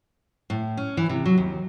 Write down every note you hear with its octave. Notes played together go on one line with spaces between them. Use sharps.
A2
C#4
E3
C3
F#3
D#2